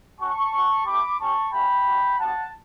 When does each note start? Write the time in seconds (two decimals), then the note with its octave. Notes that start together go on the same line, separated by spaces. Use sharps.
0.19 C#4 F#4 A5 C#6
0.53 C#4 F#4
0.86 A3 D4 G4 B5 D6
1.20 C#4 G4 A5 C#6
1.52 A3 C#4 F#4 G5 B5
1.86 G3 D4 F#4
2.19 G3 B3 D4 F#4 F#5 A5